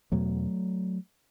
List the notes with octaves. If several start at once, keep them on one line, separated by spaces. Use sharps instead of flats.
E2 B2 F#3 A3